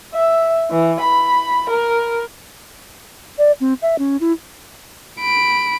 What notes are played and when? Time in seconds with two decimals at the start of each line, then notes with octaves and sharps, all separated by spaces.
0.14 E5
0.70 E3
1.00 B5
1.69 A#4
3.38 D5
3.61 C4
3.82 E5
3.99 C#4
4.21 E4
5.21 B5 D7